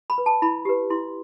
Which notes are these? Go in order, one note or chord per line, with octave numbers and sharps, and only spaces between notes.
B5
B4
A5
E4 B5
G4 B4
E4 C6